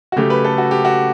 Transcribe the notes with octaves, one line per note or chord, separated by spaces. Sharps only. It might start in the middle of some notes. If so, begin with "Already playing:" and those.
F#4
C#3 F#3 A3 G4
B4
A4
F#4
G4
F#4